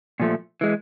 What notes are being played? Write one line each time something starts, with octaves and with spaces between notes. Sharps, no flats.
A#2 F3 A3
E3 G#3